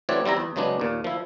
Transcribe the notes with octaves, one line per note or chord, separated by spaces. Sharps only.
E3 A3 C4 F#4 C#5 D5
G3 C4 E4 A#5
E2
C#3 F#3 G#3 B3 D4
D#2 A#2
F3 E4